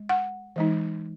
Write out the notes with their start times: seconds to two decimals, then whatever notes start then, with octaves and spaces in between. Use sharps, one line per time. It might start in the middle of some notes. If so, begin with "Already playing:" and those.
Already playing: G#3
0.09 F#5
0.56 E3 G#3 D#4